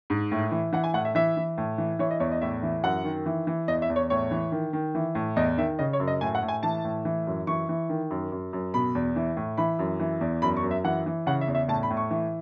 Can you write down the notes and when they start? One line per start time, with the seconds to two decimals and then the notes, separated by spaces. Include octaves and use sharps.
0.10 G#2
0.32 A2
0.51 E3
0.73 E3 F#5
0.84 G#5
0.94 A2 F#5
1.05 E5
1.15 E3 E5
1.37 E3
1.58 A2
1.78 E3
1.99 E3 C#5
2.11 D#5
2.20 E2 C#5
2.32 D#5
2.42 A2 E5
2.63 E3
2.83 F#2 F#5
3.05 D#3
3.26 E3
3.47 E3
3.68 E2 D#5
3.82 E5
3.90 E2
3.96 C#5
4.10 A2 C#5
4.31 E3
4.52 D#3
4.73 D#3
4.95 E3
5.15 A2
5.36 E2 D#5
5.58 D#3 E5
5.79 C#3 D#5
5.93 C#5
6.00 F#2
6.08 D#5
6.21 A2 G#5
6.35 F#5
6.42 A2
6.48 G#5
6.63 E3 A5
6.84 A2
7.05 E3
7.27 F#2
7.47 E3 C#6
7.69 E3
7.89 D#3
8.11 F#2
8.32 F#2
8.53 F#2
8.74 B2 B5
8.95 E2
9.16 E3
9.37 A2
9.58 E3 B5
9.79 F#2
10.00 E3
10.21 E2
10.42 F#2 B5
10.57 C#6
10.63 F#2
10.71 E5
10.84 E3 F#5
11.06 E3
11.27 C#3 F#5
11.41 E5
11.47 E2
11.55 E5
11.68 A2 A5
11.83 B5
11.90 A2
11.97 C#6
12.11 E3